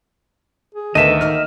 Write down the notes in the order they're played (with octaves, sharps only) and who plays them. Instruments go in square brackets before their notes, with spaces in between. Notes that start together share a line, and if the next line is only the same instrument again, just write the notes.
[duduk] G#4
[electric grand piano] D2 [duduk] D#3 [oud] B3 D#4 A4 [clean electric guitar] D#5 E5
[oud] A#3 D#4 F#4 [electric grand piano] F6